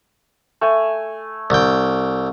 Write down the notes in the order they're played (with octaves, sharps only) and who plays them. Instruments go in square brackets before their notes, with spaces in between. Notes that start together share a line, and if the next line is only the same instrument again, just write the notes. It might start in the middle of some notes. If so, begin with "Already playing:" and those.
[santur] A3 G#5
[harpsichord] C2 G5